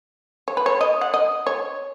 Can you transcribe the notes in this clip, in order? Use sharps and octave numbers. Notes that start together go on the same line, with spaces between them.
C#5
B4
C#5
D#5
F#5
D#5
C#5